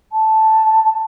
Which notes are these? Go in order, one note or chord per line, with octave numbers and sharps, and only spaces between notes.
A5